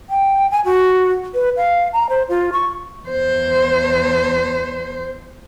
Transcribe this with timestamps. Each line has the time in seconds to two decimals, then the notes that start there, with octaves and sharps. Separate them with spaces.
0.10 G5
0.51 G#5
0.65 F#4
1.34 B4
1.57 F5
1.93 A#5
2.09 C5
2.29 F4
2.52 C#6
3.05 E2 C5